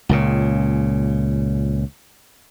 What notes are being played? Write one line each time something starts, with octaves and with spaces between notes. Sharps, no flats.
C#2 A#2 C#3